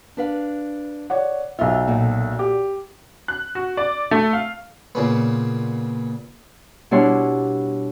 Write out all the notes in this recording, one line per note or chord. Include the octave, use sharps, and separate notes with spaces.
D4 B4 F5
C#5 D5 F#5
B1 F4 E5
A#2 F#4 A4
G4
F#6
F#4
D5
A3
F5
A#2 C#3 B3
B2 G3 D4 E4 C#5 C6